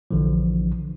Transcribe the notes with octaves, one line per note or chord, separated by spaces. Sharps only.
A#1 D3 E3 F3